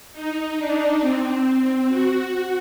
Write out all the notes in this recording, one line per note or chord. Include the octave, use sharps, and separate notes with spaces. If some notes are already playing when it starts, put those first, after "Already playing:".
D#4
D4
C4
C4
F#4